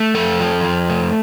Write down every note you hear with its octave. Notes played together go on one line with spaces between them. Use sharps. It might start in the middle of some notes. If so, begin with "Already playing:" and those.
Already playing: A3
F2 A4
F3
F2
A3